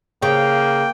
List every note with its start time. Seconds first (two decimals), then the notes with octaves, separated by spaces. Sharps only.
0.22 C#3 A#3 G5